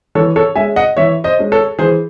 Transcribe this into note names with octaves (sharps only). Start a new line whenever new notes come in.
E3 A4 C#5
A4 C#5
G#3 C#4 E5 G#5
D#5 F#5
E3 C#5 E5
C5 D#5
G#3 C#4
A4 C#5
E3 G#4 C5